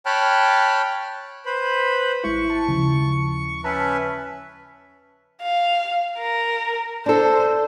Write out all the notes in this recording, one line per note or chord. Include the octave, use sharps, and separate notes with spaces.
C#5 G5 A5 B5 F6 F#6
B4 C5 B5
A1 G#3 E4 C#6
A5
D#2 C#3 F3
C#4 B4 E5 A5
F5
A#4
D4 A4 C5